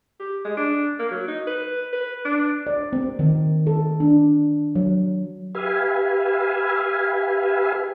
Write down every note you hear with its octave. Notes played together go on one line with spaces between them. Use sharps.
G4
G#3
D4
A#3
F#3
D#4
B4
B4
D4
D5
C4
D#3
A4
D4
F#3
G4 B4 E5 F5 G#5